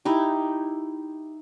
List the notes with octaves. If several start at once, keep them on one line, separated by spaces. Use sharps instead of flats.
D#4 E4 G4